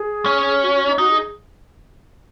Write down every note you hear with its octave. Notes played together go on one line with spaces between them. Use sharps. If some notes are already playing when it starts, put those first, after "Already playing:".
Already playing: G#4
C#4
F#4
F#4
D#4
D#4 F#4
G#4